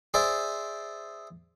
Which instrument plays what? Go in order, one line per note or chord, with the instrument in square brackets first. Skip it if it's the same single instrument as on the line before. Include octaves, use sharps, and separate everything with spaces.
[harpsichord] G#4 C5 D5 E5